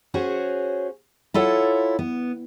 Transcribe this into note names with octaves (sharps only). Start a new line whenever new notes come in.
C#4 F#4 G#4 C5 C#5
E4 F4 A4 C#5 F#5
B3